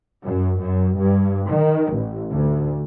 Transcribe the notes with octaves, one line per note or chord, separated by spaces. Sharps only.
F#2
F#2
G2
D#3
A1
D2